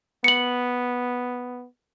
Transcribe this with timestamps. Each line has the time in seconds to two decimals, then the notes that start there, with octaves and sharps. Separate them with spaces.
0.24 B3 C#7 F#7